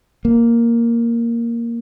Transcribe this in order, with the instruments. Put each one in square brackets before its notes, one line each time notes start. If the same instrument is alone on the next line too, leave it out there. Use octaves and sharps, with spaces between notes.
[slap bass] A#3